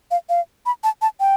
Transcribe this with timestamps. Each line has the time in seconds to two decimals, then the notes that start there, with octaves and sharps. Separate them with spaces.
0.11 F5
0.29 F5
0.66 B5
0.84 A5
1.02 A5
1.20 G5